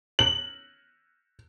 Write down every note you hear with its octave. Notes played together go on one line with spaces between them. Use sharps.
F#7